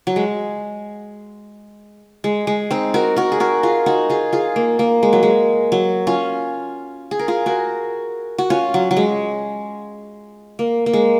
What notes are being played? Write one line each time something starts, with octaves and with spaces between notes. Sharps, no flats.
F#3
G#3
G#3
G#3
C4 D#4
F#4 A#4
F#4 A#4
G#4
F#4 A#4
F4 G#4
D#4 F#4
F4 G#4
F4 G#4
A#3
A#3
G#3
F#3
G#3
F#3
C#4 F4
G#4
A#4
F4 G#4
F#4 A#4
F#4
C#4 F4
F#3
F#3
G#3
A#3
A#3
G#3